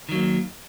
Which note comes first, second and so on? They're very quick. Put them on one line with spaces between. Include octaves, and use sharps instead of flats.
D#3 F#3 A#3